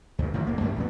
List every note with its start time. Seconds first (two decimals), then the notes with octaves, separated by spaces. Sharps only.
0.18 D2 G2
0.34 A2 D#3 F3 F#3
0.46 D#1 A#3
0.60 F#2 A2 D3 G3
0.76 A#1 F2 B3